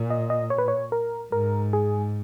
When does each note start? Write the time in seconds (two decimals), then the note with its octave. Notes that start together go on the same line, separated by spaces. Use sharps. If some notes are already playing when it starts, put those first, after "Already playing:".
Already playing: A#2
0.10 D#5
0.30 D#5
0.50 C#5
0.58 B4
0.68 C#5
0.92 A#4
1.32 G#2 A#4
1.73 G#4